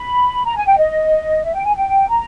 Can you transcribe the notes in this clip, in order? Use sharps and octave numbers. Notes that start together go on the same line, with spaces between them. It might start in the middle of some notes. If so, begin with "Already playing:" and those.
Already playing: B5
A#5
G#5
G5
D#5
E5
G5
G#5
G5
A#5